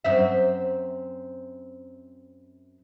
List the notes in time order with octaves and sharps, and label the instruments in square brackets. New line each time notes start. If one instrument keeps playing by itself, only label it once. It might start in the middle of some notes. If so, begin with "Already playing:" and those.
[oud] F#2 C4 E5